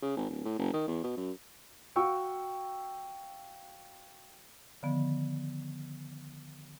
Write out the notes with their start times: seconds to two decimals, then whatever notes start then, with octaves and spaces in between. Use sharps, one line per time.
0.02 C#3
0.17 G#1
0.30 D1
0.45 A2
0.59 F#1
0.73 D#3
0.88 E2
1.04 B2
1.17 F#2
1.96 F#4 F5 G5 C#6 E6
4.83 D3 D#3 F3 B3